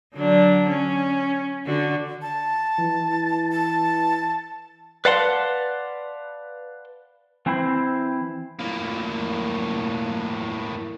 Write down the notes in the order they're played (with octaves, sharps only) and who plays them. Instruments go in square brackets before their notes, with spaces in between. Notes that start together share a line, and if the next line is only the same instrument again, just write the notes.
[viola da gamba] D3 F#3 D4
C#4
D3 D4 F#4
[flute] A5
[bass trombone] E3
[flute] A5
[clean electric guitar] B4 D5 F5 F#5 A5 C6
[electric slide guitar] E3 C4 E4 C5
[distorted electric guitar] A2 A#3